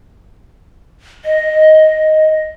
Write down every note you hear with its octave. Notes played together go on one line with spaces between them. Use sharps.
D#5